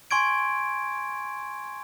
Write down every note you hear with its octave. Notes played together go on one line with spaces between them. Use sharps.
G#5 C6 C#6 G#6 D7